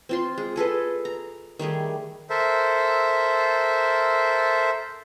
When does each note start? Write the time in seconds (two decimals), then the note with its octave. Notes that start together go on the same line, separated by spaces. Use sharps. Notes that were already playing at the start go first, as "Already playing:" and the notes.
0.09 C4 F4 C6
0.38 G#3
0.56 G#4 A4 B4 D#5
1.05 A#5
1.59 D#3 G3 A3 G#4
2.30 A4 A#4 C5 E5